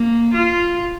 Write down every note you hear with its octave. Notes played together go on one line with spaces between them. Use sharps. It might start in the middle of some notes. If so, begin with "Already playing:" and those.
Already playing: A#3
F4